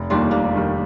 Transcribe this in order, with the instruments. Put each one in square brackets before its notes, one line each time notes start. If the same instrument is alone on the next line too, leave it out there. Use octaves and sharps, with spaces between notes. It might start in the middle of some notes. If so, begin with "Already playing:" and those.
Already playing: [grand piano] F1
[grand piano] D#2 D#3 G3 [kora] D4 F4
[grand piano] F1 [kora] A#3 D4
[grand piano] D#2 D#3 G3